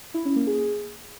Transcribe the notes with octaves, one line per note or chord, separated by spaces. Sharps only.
E4
C#4
A#3
G#4